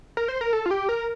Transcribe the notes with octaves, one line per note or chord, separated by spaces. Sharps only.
A#4
C5
A#4
A4
F4
G4
A#4